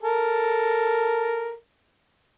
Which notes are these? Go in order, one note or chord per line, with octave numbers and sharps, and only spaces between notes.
A4 A#4